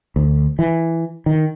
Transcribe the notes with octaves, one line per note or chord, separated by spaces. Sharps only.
D2
E3
D#3